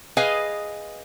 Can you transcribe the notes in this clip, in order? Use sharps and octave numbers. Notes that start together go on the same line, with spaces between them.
G#4 B4 D#5 F5 G#5